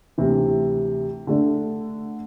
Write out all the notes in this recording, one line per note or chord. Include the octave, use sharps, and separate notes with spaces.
D2 C3 E3
D3 A3 D4